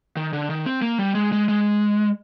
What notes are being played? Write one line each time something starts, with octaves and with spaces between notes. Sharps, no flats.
D#3
D3
D#3
C4
A#3
G3
G#3
G#3
G#3